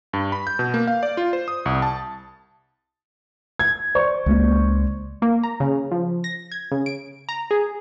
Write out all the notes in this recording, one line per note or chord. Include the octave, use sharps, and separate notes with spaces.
G2
B5
G6
B2
A#3
F5
D5
F4
C5
D#6
C2
A5
G#6
C5 D5 C#6
C#2 G#3 A#3
A#3
A#5
C#3
F3
A#6
G#6
C#3
D7
A#5
G#4